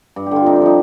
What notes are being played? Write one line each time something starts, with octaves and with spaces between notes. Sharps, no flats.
G2
G4
D3 F4
C3 D#4
D4
F3 D#4